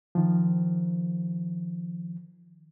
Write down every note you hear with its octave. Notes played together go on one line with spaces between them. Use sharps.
D#3 F3